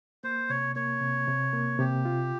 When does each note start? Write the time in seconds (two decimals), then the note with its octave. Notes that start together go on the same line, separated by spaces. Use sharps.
0.24 A#3 C5
0.50 C3 C#5
0.76 A#3 C#5
1.01 C3
1.27 C3
1.53 A#3
1.79 C3 G4
2.05 F4